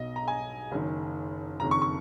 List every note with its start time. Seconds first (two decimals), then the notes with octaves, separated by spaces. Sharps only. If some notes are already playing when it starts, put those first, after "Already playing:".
Already playing: B1 B2 D#5
0.16 A#5
0.28 G#5
0.71 F#1 F#2 D#3
1.60 F#1 F2 D#3 A#5
1.71 C#6
1.82 C#6